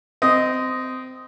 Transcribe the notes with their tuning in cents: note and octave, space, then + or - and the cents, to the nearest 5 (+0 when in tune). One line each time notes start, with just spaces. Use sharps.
C4 -20 D#5 +0 D#6 +5